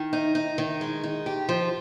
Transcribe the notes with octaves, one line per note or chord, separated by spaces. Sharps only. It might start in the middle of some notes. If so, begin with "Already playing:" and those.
Already playing: D#3
D#4
D#4
D#3
G#3
D#4
G4
F3